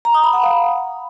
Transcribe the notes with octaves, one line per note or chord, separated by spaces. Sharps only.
A#5
D#6
B5
F#5
F5